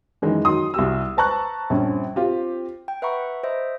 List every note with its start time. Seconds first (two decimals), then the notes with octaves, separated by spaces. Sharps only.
0.22 F#2 D#3 E3 G#3 D#4
0.45 D#3 F#3 C6 D#6
0.74 C2 F#4 G4 E6
1.17 B4 C5 A5 A#5 C#6 F#6
1.70 A#1 G2 C4 C#4
2.16 C4 F4 G4
2.88 G5
3.02 B4 E5 F#5 A#5 B5 C#6
3.43 C5 D#5 E5